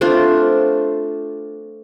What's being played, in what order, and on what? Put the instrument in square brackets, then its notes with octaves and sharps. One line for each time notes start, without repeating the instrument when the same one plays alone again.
[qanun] A3 C4 D4 F4